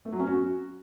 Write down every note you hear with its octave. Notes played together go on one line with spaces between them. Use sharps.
A3
F#3
C#4
F#4